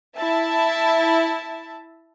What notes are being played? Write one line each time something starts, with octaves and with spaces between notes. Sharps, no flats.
E4 E5 A5